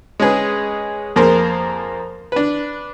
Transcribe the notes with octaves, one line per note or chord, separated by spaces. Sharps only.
G#3 C#4 G#4 B4
F2 A#3 G#4 A#4 C5 C6
D4 B4